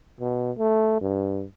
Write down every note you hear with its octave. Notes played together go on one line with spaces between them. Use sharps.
B2
A3
G2